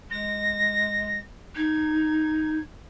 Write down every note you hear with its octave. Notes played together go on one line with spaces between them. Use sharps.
G#3 A#6
D#4 G#6